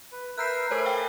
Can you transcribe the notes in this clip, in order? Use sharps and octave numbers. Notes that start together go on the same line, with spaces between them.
B4
A#4 B4 E5 F#6 G6 C7
A3 A#4 C5 C#5 G#5 B5
F5 G5